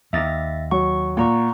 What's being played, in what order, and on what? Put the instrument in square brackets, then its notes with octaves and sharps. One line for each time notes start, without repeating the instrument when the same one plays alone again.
[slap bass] D#2 [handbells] E5 A6 A#6
[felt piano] F#3 [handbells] C#6
[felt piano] A#2 [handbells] F#5 A#5 C#6